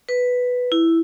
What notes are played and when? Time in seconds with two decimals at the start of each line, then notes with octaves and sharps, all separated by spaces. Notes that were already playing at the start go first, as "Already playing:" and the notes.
0.09 B4
0.72 E4